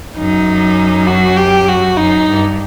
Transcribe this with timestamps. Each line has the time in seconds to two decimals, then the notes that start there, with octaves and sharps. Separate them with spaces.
0.17 F#2 D#4
1.08 F#4
1.37 G4
1.68 F#4
1.97 F#2 D#4
2.28 G2